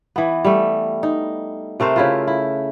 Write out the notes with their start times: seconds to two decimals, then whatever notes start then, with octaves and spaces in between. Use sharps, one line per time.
0.16 E3 B3
0.45 G3 A3
1.03 D#4
1.80 C3 A3 A#4 C5
1.96 C#3 E4 F4
2.27 E4